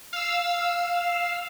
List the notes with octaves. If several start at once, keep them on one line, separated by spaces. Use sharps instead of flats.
F5 E6